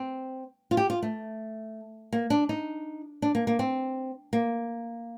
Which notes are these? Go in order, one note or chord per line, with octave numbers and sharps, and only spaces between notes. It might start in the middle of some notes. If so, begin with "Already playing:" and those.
Already playing: C4
F4
G4
F4
A3
A#3
D4
D#4
D4
A#3
A#3
C4
A#3